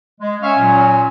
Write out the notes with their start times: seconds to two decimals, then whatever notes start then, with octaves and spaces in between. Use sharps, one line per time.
0.21 G#3
0.42 C#4 E5 F5 C#6
0.58 A#2 F#3